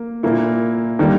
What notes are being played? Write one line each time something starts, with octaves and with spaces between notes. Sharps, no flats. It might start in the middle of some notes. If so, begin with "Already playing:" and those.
Already playing: A#3
A#2 A#3 E4
D#3 G3 A#3